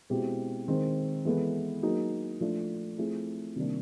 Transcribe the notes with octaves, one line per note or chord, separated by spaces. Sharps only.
B2 G#3 C4 E4 G4
D#3 G#3 C4
E3 G#3 B3 E4 A4
F#3 A#3 D#4 G#4
F3 A3 D4 F4
F3 A3 C4 E4 G#4
C3 D#3 G3 A#3 D4